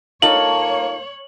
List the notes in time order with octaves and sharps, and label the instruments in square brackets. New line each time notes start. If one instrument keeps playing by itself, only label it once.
[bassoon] A#3 [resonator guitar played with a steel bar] D#4 F4 A4 [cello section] C#5 [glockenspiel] F#7